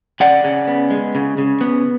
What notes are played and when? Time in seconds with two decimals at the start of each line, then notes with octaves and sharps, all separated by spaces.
0.20 C#3 D5 F#5
0.44 C#3
0.68 B3
0.90 G#3
1.15 C#3
1.38 C#3
1.61 B3